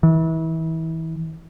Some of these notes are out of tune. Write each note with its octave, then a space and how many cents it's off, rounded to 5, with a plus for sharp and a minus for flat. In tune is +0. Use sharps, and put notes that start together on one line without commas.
E3 -30